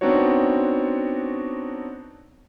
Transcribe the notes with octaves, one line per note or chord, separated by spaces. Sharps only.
B3 C4 D4 D#4 F#4 C#5